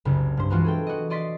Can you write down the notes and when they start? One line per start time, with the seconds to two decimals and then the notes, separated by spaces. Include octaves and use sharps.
0.05 F#1 C2 C#3
0.37 G2 C5
0.50 E3 F3 G#3 B3 F4 F#4
0.64 G#4 A4 G5
0.87 F#4 D#5
1.10 D5 D#5 C6 A6 B6